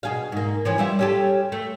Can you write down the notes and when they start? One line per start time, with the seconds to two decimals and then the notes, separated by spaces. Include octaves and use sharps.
0.03 B2 G#4 F5
0.32 G#2 A#3
0.65 E3 F3 C#4
0.78 G3 E4 F4
0.99 C#4 G4 A4
1.52 A3